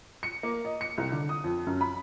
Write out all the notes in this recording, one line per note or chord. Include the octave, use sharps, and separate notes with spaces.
C#7
A#3
D#5
C#7
C2
D3
D#6
F2
F#2
B5